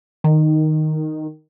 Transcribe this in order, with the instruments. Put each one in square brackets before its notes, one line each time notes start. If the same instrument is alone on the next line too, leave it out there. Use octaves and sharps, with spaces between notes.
[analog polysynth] D#3